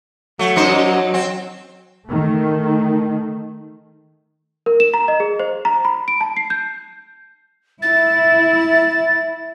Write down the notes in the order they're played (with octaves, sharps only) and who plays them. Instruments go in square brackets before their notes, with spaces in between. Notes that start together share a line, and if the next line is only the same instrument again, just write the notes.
[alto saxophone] F#3 [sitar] A3
[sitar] F#2 D#4 C5
C4
[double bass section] D#3 A3
[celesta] A#4
E7
A#5
D#5
G#4
C5
A#5
B5
D7
A5
C7
G6
[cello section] E4 [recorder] A6